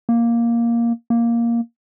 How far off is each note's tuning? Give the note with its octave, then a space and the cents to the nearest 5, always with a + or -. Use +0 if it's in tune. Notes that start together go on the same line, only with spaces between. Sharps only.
A#3 +5
A#3 +5